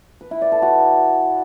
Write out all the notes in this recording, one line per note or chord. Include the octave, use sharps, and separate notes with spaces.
B4
E4
D5
A4
F#4